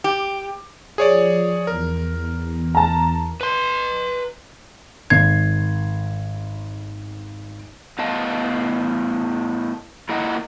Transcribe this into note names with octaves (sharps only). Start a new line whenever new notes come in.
G4
F3 G#4 C#5 D5
E2 A#4
A5 A#5
B4 C6
G#1 G#6 C7
A2 B3 D#5 F5 A5
A#3 E4 F4 A#4 D#5 F#5